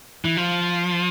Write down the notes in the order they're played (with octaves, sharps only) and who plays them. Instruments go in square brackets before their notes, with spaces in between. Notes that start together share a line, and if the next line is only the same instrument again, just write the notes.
[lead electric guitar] E3
F3